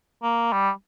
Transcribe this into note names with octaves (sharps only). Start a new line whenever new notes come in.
A#3
G3